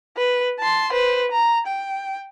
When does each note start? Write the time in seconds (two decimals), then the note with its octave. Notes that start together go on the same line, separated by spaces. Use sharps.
0.17 B4
0.60 A5 C6
0.93 B4 C5
1.32 A#5
1.67 G5